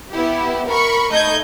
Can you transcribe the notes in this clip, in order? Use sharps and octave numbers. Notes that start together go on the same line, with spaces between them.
B3 E4 G4
A#4 B5 C#6
A3 D#4 D#5 G6 G#6